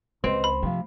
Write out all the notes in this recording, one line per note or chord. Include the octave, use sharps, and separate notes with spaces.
C#2 C4 B4 D#5
B5
C3 F3 A3